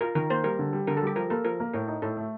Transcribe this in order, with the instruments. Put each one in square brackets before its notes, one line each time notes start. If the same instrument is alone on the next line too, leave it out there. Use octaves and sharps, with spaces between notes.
[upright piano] F4 [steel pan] A#4
[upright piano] D#3 [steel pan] A#4
[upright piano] A#3 [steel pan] C5
[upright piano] G3 [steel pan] A#4
[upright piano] D3
G3
[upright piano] D3 [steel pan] A#4
[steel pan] A4
[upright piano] G3
[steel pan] G4
[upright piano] F3 [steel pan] A#4
[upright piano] A#3 [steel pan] A4
[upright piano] F3 [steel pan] A#4
[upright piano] A#3
[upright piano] A2 [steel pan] A#4
[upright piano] D#4
[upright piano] A2 [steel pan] A4
[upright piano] A3